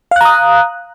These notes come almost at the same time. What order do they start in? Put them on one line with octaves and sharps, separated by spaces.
F5 F#6 A#5 D#6